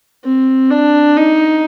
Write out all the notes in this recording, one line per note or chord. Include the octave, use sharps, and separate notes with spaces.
C4
D4
D#4